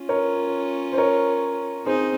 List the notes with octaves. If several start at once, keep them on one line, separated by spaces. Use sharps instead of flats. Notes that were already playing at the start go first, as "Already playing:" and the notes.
Already playing: C#4 F4
A#4 C#5
C5
A#4 C#5
C4 D#4 G#4 C5